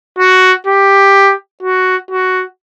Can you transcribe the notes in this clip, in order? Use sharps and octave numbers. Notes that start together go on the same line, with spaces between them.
F#4
G4
F#4
F#4